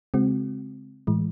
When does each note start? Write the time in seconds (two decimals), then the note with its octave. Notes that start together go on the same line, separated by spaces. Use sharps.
0.14 C#3 G#3 C4 F#4
1.07 A2 E3 G#3